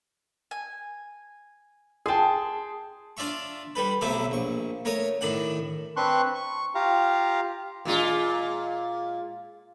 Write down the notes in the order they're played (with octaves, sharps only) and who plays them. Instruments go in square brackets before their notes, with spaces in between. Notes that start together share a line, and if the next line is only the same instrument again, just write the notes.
[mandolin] G#5
[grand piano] G#4 G5 [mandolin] A5 C6
[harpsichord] D4 F4 D5 E5 C#6
G3 A4 B4
B1 C3 F#3 A3 E5 D6
A#1 C#6
A3 A#4 C#5 D#6
A2 D#3 D4 F#5
[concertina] C4 D4 B4 C6 C#6 F#6
C#6
F4 G4 F5 A#5
[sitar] A#2 G#3 F4